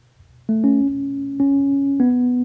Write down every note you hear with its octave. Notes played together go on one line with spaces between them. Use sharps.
A3
C#4
C#4
B3